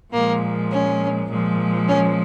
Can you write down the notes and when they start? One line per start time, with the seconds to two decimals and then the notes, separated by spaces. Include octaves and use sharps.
0.13 A#2 F3 G#3 A#3
0.71 C#4
1.30 A#2 F3 G#3
1.88 C#4